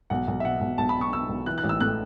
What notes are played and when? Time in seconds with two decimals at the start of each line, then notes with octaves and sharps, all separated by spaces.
0.10 B1 F#5
0.28 B1
0.40 E5
0.44 B2 F#5
0.61 B1
0.78 B1 A5
0.89 B5
0.96 B2
1.01 C#6
1.12 B2 E6
1.29 B1
1.46 E3 F#6
1.58 F#6
1.64 A1
1.69 E6
1.80 A2 F#6